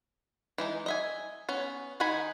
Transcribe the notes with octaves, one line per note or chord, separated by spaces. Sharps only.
E3 G#3 D#4
D#5 E5 G#5
B3 C#4
D#3 D#4 F#5 G#5 B5